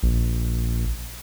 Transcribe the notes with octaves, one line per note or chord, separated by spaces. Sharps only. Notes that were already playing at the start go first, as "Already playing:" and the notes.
A#1